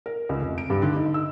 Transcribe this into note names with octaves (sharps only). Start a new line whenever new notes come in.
A#4
C#2
F1
D7
G2
D3
D#4
E6